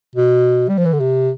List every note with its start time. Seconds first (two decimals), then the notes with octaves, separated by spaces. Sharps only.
0.15 B2
0.69 G3
0.78 F3
0.85 E3
0.93 D3
1.00 C3